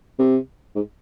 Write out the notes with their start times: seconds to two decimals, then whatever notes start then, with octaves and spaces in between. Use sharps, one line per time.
0.19 C3
0.75 G#2